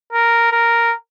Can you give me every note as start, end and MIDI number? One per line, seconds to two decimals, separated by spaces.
0.13 0.51 70
0.52 0.94 70